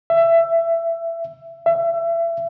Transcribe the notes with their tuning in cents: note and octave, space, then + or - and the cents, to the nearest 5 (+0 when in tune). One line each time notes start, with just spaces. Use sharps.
E5 +20
E5 +30